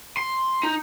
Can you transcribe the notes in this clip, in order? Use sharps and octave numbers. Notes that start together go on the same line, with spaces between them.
C6
D#4